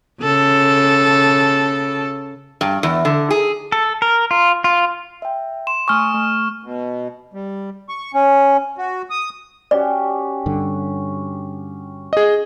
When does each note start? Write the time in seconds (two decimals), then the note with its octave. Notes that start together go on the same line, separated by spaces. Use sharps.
0.22 C#3 A4
2.61 G2
2.83 E2
3.05 D3
3.31 G#4
3.72 A4
4.02 A#4
4.31 F4
4.64 F4
5.22 E5 G5
5.67 C6 E7
5.88 A3 G#5 C#6 D#6 F6
6.14 A3
6.63 B2
7.34 G3
7.89 C#6
8.14 C#4
8.78 F#4
9.10 D#6
9.71 C#4 F#4 G4 D5
10.46 G2 D3
12.13 G#4 D#5